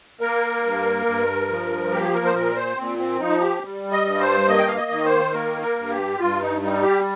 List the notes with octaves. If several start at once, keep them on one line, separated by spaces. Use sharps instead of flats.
A#3 A#4
G2
G2
F3
A#3 G4
A#4
C5
A#2 A#4
C5
A#2 C4
C4
F3 D#4
G4
G3
D#5
G2
C5
A#3 D#5
G5
F5
D#5
D#3
C5
A#3 A#4
A#4
G2
G4
G2 F4
D#4
G3 D#4
G4